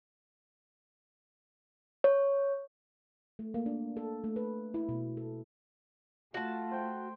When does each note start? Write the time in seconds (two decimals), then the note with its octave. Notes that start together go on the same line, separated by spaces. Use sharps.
2.04 C#5
3.39 A3
3.54 A#3
3.66 D4
3.97 A4
4.24 A3
4.36 B4
4.74 E4
4.89 B2
5.17 A4
6.34 A3 F4 F#4 A5
6.71 C5 G5